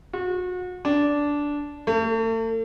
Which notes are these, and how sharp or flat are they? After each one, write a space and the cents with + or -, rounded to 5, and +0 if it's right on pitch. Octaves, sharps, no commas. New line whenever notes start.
F#4 -35
D4 -10
A3 +40